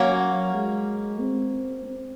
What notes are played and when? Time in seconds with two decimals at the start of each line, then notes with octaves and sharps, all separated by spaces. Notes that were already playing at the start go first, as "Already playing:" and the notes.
Already playing: F#3 A#3 C#4 F#4
0.55 G#3
1.20 C4
1.86 C4